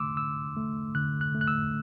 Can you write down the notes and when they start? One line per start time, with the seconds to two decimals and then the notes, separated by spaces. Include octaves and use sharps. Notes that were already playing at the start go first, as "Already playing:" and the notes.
Already playing: D3 A3 C6 D6 E6
0.17 D3 E6
0.57 A3
0.95 D3 F#6
1.21 F#6
1.35 A3
1.41 F#6
1.47 E6